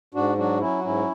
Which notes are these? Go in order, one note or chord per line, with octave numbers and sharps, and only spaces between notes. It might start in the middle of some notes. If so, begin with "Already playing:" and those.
G#2 D4 F#4
F#3 D4 F#4
F#3 C#4 E4
F#4
G#2 C#4 E4